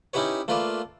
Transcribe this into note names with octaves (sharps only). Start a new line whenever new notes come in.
C#4 D#4 E4 G4 B4 C#5
A3 A#3 F4 B4 D5